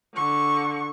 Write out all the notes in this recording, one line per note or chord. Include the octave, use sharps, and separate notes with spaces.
D3 C#6